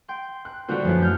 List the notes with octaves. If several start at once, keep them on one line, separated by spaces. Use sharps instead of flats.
G5 C6
F#6
A#2 D3 G3 F#4 C5
F#2 A2 F3 A3 B3 E4
F6 G6